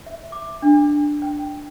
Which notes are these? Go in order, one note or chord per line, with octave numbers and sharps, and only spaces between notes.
E5
D6
D4
G5